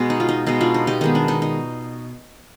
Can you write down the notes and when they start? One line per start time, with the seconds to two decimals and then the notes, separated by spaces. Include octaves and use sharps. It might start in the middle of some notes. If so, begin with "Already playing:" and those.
Already playing: B2 G#3 B3
0.10 D#4
0.20 F4
0.29 D#4
0.47 B2 G#3 B3 D#4
0.61 D4 F4
0.74 D#4
0.87 D#4 G4
1.01 D#3 G#3 B3 D#4
1.15 D4
1.28 D#4
1.42 D#4